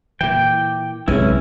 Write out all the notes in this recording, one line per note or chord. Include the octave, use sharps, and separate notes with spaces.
A#2 E3 E4 G5 D6
B1 F#2 A2 C3 G#3 C#4 E4 B4